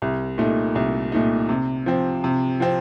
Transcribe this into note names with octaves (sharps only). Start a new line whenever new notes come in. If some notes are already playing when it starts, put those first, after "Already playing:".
C2
A#2 A3 D#4
C2
A#2 A3 D#4
C3
F3 C4
C3
F3 C4